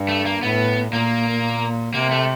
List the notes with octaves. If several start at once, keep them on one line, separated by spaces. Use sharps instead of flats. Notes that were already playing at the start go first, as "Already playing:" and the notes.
Already playing: G2
A3
A#3
A2 B3
A#2 A#3
C3 A#3
A3